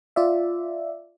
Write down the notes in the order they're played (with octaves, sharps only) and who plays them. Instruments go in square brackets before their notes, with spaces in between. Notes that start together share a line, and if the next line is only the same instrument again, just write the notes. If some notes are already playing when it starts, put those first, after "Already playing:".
[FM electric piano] F4 D5 E5